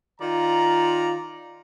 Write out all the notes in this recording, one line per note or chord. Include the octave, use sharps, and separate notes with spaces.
D#3 F4 D5 A#5